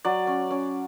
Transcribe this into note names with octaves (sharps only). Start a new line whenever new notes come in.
F#3 D5
C#4
C#4